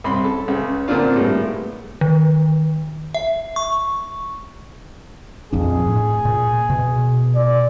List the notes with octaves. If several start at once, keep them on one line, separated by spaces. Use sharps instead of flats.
C2 C#4 B5 C6
A4
C#2 C#3
A#2 D3 C4 D4 F4 F5
A2 G3 G#3 B3
D#3
E5
C#6
A#1 F2 D4 G#4
A2
A#2
B2
D5